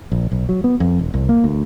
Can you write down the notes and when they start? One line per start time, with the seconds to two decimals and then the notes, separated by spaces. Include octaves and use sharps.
0.12 A#1
0.32 B1
0.49 F#3
0.64 B3
0.80 F2
0.99 E1
1.14 C2
1.29 A#3
1.44 D2